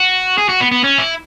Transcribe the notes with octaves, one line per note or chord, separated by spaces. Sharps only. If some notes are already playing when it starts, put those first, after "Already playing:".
Already playing: F#4
G#4
F#4
B3
B3
C#4
E4